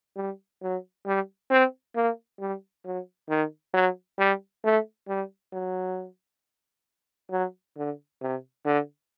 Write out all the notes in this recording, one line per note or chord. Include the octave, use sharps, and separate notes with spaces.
G3
F#3
G3
C4
A#3
G3
F#3
D#3
F#3
G3
A3
G3
F#3
F#3
D3
C3
D3